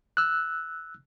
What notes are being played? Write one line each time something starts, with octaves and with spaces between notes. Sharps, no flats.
E6 F#6